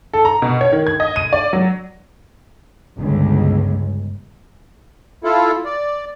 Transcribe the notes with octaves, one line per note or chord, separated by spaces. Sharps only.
A4
A#5
B2
C#5
D#3
G#6
D#5
D#7
D5
F#3
G1 C#2
E4 F4 A4
D5